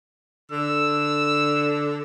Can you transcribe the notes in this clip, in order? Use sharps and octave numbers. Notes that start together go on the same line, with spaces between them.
D3 E6